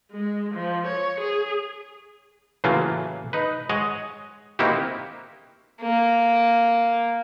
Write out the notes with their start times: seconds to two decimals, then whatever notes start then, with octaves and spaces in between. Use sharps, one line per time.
0.11 G#3
0.54 F3
0.87 C#5
1.20 G#4
2.64 A2 C#3 E3 F#3 A#3 F4
3.33 D#4 B4
3.69 G#3 C#5 D#5 F#5
4.59 A#3 C4 D#4 E4 F#4 G4
5.81 A#3